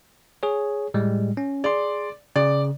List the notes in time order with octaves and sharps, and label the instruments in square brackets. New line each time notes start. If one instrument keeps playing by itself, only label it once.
[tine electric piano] G#4 C#5
A2 G3 G#3
C#4
[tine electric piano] G#4 C6 [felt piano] D5
[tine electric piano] C#3 [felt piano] D5